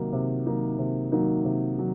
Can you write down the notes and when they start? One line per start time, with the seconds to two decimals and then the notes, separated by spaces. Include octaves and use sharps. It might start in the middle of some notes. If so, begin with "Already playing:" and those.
Already playing: C3 D#3 F#3 A#3 D#4
0.13 C3
0.46 D#3 F#3 A#3 D#4
0.79 C3
1.12 D#3 F#3 A#3 D#4
1.45 C3
1.78 D#3 F#3